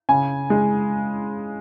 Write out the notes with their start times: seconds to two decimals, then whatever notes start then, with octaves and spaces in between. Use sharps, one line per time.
0.09 C#3 G#5
0.50 G#3